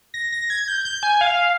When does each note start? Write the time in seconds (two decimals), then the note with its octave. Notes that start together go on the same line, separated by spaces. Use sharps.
0.14 A#6
0.32 A#6
0.50 G#6
0.68 G6
0.85 G6
1.03 G#5
1.21 F5